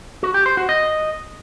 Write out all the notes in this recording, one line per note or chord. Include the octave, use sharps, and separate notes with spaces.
F#4
G4
C5
F#4
D#5